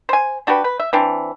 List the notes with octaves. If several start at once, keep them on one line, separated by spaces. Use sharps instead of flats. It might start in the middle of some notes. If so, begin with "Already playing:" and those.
C5 G#5
D4 F#4 G4 B4
B4
E5
E3 C4 D4